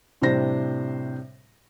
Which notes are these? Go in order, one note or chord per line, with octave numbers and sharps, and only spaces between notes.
A2 C3 G3 D4 C5 A#6